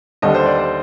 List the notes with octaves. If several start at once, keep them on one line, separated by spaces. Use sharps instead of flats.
D#2 D3 G3 D#5
C5
D5
C5